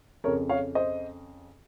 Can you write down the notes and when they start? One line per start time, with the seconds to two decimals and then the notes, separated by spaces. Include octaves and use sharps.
0.24 F2 C#3 A#4 C#5
0.49 C#5 F5
0.75 C5 D#5